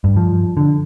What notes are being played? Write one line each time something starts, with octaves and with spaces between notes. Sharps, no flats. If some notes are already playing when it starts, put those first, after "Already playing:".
G2
F3
D3